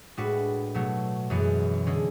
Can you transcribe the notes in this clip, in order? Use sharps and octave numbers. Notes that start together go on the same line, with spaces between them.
A2 G#3 D4 F#4 B4
B2 F#3 A3
F#2 E3 G#3 B3
D3 G#3 C#4